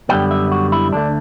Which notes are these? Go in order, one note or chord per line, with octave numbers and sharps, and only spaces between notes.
F#2 D3 G3 B3 G5
E5
F#4
E4
D2 D3 A3 D4